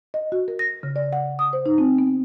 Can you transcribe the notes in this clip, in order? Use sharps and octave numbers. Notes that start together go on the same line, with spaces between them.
D#5
F#4
A#4
A#6
C#3
D5
F#5
D#6
C5
D#4
C4
B3